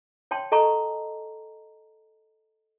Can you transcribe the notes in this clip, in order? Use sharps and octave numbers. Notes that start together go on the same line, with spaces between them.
C#5 G5 A5 C6
A4 D#5 A5 A#5 C#6